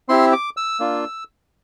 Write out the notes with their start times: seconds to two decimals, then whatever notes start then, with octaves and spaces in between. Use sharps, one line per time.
0.09 C4 E4 G4 C6
0.33 D6
0.57 E6
0.80 A#3 D4 F4